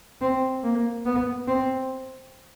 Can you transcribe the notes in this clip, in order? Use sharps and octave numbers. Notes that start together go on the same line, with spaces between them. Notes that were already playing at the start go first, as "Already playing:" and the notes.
C4
A#3
B3
C4